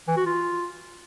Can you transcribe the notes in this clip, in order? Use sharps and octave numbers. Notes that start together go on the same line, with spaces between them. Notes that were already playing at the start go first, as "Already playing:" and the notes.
E3
F#4
F4